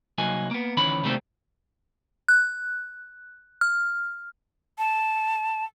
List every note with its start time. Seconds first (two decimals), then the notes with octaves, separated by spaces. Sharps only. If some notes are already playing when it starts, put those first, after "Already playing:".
0.18 C2 F#3 A#3 D#4 G#5
0.51 A#3 B3
0.77 D2 D#3 E3 C#4 B5
1.04 C3 D#3 G3 A3 A#3 C4
2.28 F#6
3.61 F6
4.78 A5